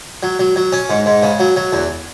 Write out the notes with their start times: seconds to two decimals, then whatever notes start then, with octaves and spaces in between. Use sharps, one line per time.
0.23 F#3
0.39 F#3
0.56 F#3
0.72 C#4
0.90 G#2
1.06 G#2
1.23 C#3
1.39 F#3
1.57 F#3
1.73 E2